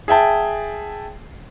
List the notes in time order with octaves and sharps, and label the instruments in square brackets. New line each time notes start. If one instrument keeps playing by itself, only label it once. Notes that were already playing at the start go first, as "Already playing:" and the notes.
[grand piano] G#4 E5 G5 A5